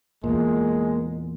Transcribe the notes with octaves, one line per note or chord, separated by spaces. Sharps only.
E2 A#2 G#3 A#3